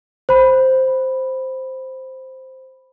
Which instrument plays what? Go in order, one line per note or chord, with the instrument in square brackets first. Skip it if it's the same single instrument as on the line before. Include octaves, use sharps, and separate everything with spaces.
[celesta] C5 B5